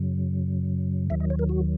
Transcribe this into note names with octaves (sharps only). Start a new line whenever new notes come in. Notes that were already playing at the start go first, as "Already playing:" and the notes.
Already playing: F#2 C#3 F#3
D#2 D#3 F#3 E5
D#5
C#5
A#4
F#4